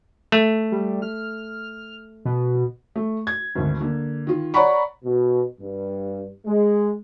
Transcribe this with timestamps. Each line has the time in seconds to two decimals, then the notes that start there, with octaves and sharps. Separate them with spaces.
0.32 A3
0.72 G3
1.02 F6
2.25 B2
2.96 A3
3.27 G#6
3.55 G#1 D2
3.81 D3 A#3
4.27 D#3 F4
4.54 C#5 D5 F#5 A#5 B5 C#6
5.04 B2
5.61 G2
6.46 G#3